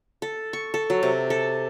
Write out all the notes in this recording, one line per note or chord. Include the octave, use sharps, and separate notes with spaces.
A4
C#6
A4
F#3
C3
A4